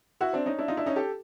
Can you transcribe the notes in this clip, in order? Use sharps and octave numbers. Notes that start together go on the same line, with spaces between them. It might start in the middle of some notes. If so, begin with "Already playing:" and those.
E4 F#4
C4 D4
C#4 D#4
D4 E4
D#4 F4
D4 E4
C#4 D#4
G4 A4